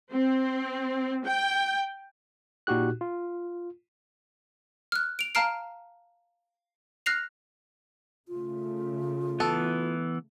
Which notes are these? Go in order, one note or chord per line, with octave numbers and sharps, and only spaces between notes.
C4
G5
A#2 D#4 F#4 G4 F#6
F4
F6 F#6
D7 F7
F5 A5 A#5 F6 C7 D7
F6 F#6 A#6 C7 F7
C#3 A3 F4
E3 B3 A4